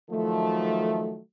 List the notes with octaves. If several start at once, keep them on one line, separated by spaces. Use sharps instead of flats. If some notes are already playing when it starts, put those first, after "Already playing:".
D#3 F3 F#3 A3